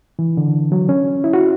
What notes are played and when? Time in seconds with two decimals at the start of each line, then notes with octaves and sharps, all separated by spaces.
0.19 E3
0.37 D3
0.72 F#3
0.89 C#4
1.24 E4
1.33 F#4